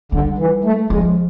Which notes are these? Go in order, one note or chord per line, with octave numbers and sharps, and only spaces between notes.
D3 G3
E3
A3
F3 G#3